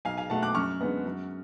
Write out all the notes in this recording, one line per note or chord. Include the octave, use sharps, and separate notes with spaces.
B1 F5 G#5
F5 G#5
B2 A3 F#5 A5
D6 F#6
F#2 C#6 F6
D3 G#3 B3
F#2